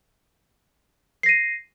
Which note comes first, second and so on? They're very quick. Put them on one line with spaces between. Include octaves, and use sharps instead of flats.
C7 A#6 D#7